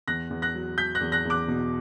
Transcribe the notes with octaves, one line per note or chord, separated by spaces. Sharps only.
E2 F#6 A#6
E2
F#6 A#6
F#3
F#3 G6 B6
F#6 A#6
E2
F#6 A#6
E2
D6 F#6
B2